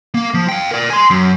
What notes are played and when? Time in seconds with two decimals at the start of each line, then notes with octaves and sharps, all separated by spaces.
0.15 A#3
0.34 F3
0.49 F5 G5
0.71 A#4 D5
0.90 G#5 C6
1.11 F#2